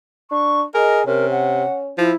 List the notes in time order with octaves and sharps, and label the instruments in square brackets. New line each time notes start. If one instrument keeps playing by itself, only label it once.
[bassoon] D4 [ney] C#6
[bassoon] G#4 [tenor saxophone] A#4 [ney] D#5
[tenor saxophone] C3 [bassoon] C#4 [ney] A#4
[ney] F#5
[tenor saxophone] F3 [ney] E4